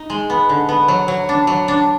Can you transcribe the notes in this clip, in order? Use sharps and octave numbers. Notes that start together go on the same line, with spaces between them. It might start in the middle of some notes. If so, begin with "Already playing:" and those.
Already playing: D#4
G#3
B3
D3
B3
F#3
F#3
D4
F#3
D4